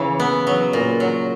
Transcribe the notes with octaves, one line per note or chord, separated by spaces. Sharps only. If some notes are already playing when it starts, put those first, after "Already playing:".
Already playing: C#3 E3 E4
B3
F#3
A#2
F#3